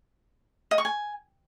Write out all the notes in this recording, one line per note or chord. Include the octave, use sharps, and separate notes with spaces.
D#5
C#6
G#5